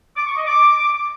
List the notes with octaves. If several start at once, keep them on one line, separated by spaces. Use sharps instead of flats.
D6
C#6
D#5
D6